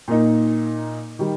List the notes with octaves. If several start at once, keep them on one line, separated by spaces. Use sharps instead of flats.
A#2 A#3 D#4
D#3 G3